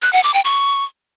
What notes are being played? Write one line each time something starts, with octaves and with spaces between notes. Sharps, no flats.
F#6
F#5
D6
G5
C#6